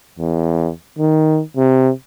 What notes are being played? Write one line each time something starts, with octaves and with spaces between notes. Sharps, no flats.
E2
D#3
C3